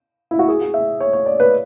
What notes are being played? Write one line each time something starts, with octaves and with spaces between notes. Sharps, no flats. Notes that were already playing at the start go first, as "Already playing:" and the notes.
E4
F#4
G#4
F#4
E5
C#5
C#5
D5
B4